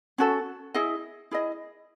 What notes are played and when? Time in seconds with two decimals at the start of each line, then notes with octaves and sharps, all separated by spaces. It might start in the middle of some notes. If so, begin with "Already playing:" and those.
0.18 C#4 F#4 A4
0.74 E4 G#4 D#5
1.31 E4 G#4 D#5